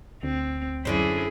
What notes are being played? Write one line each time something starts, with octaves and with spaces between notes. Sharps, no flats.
D2 C4
F#2 D3 E4 G#4 C5